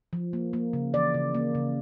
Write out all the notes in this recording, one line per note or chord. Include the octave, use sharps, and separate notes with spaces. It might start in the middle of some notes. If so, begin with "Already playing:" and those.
F3
A#3
A#3
C#3
E3 D5
C#3
A#3
C#3